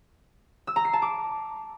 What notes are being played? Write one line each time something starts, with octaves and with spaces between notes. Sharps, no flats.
E6
A#5
C7
A5
D6